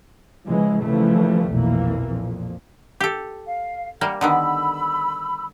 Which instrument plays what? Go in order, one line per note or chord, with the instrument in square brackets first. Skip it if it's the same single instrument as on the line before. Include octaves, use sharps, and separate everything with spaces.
[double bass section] C#3 E3 F3 G#3
C#3 E3 F3 G3 A3 A#3
B1 F2 A#2 E3 A#3
F2 A#2
[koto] G4 A4
[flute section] F5
[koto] G3 A#3 [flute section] F#5
[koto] D3 D#3 B3 [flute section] B5 E6